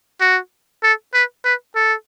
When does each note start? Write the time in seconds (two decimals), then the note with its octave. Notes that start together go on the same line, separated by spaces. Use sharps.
0.20 F#4
0.83 A4
1.14 B4
1.45 B4
1.76 A4